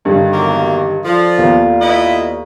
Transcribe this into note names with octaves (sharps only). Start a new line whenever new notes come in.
G2 D3 D#3
E2 F#3 A#3
F3 A4 D5
D#2 B3 F4 A#4
E4 B4 D#5